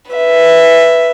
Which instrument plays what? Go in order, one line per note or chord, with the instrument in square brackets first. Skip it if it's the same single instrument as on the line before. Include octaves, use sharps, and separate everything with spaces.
[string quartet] B4 E5